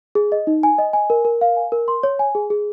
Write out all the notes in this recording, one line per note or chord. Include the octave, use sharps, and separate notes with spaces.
G#4
D#5
D#4
G#5
D#5
G#5
A#4
A#4
F5
G#5
A#4
C6
C#5
G#5
G#4
G#4